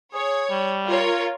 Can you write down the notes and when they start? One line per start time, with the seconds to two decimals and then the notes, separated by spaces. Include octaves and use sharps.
0.14 G#4 C#5
0.50 G3
0.85 F4 A#4 C#5